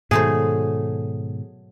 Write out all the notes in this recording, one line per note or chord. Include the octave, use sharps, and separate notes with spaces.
G#2 B2 D#3 F#3 A3 G#4 C5